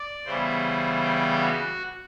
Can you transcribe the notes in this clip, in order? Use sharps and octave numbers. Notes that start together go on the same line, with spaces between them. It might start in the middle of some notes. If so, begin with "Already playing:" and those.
Already playing: D5
C#3 E3 G3 B3 C5
G4
F#4